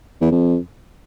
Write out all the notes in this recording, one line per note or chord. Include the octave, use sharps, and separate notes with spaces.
E2
F2